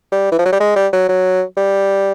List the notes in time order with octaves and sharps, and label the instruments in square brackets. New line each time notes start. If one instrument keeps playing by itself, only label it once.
[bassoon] G3
E3
F3
F#3
G3
G#3
G3
F#3
F#3
G3